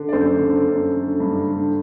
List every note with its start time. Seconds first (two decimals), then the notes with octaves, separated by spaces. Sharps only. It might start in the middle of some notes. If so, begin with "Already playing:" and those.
Already playing: D3
0.09 D5
0.13 F#2 A4 C5
0.40 D3
0.68 F#2
0.94 D3
1.20 G2
1.47 D3